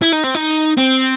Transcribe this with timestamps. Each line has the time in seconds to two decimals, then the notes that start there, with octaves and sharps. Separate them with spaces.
0.02 E4
0.13 D#4
0.24 C4
0.35 D#4
0.77 C4